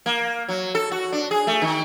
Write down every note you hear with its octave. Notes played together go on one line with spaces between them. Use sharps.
A#3
F#3
A4
F#4
D4
G#4
A3
D#3